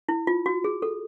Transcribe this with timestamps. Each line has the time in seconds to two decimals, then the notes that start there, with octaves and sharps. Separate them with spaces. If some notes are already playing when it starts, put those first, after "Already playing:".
0.09 E4
0.27 F4
0.46 F#4
0.64 G#4
0.82 A4